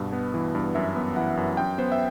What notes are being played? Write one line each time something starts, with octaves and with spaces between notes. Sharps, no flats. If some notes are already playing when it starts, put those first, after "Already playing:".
Already playing: G2 B2
B3
E3
G2
F#2 E5
B3
E3 F#5
F#2
F#2 G5
B3 C5
E5